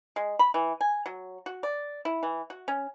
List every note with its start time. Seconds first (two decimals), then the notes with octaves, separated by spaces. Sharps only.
0.16 G#3
0.39 B5
0.54 E3
0.81 G#5
1.06 F#3
1.46 F#4
1.63 D5
2.05 E4
2.23 E3
2.50 F#4
2.68 C#4